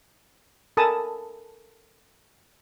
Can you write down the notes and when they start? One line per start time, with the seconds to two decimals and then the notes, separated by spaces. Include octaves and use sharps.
0.77 A4 A#4 G#5 A5 B5 D#6